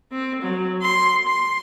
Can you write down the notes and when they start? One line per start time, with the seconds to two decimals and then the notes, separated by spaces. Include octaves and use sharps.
0.12 C4
0.42 F#3
0.82 C6
1.27 C6